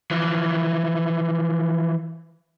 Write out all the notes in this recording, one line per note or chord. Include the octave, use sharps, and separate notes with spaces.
E3 F3